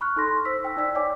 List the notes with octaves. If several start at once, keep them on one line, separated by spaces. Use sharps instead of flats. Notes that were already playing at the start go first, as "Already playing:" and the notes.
B5 C#6 F6 F#6
D#4 A4 C6 A#6
C5 E6 B6
G5 E6
D#4 D5 E6 B6
C#5 D5 G5 G#5 D6